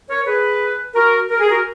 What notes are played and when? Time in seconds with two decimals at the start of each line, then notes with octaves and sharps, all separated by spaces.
0.09 A#4 C#5
0.26 G#4 B4
0.95 F#4 A#4
1.30 A#4
1.41 G#4
1.52 F#4 A#4